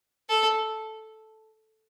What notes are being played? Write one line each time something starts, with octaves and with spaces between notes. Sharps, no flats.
A4